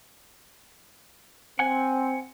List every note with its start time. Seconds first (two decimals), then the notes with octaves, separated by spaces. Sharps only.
1.59 C4 F#5 G#5